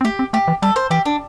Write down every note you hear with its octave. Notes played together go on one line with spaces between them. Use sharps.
C4
A3 G4
C4
A3 G4
E3
G3 A4
C5
E3 G4
D4